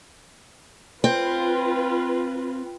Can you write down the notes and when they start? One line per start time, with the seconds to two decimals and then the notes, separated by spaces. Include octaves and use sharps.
1.04 C4 F4 B4